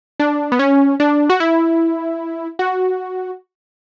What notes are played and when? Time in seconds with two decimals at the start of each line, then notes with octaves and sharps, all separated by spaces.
0.20 D4
0.52 B3
0.59 C#4
1.00 D4
1.30 F#4
1.40 E4
2.59 F#4